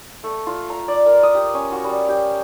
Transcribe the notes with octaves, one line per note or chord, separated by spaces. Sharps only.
A3
F4
A#5
D5
A#4
D#6
G4
C#4
F#4
G3
G4